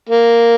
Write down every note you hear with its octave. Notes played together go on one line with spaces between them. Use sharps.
A#3